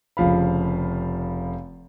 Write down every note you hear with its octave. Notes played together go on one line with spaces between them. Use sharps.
F1 C#3 F3 F5 B5